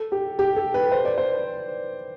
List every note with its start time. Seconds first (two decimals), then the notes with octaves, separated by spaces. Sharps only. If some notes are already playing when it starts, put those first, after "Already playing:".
Already playing: A4
0.12 G4
0.39 G4
0.56 A4
0.74 B4
0.92 C5
1.05 D5
1.18 C5